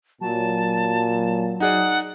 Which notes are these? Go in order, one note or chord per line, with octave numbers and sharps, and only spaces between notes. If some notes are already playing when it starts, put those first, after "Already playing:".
A#2 F#3 A5
D#4 G#4 D5 F#5